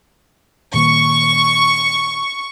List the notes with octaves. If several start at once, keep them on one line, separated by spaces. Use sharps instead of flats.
A#2 D#3 A#3 C#6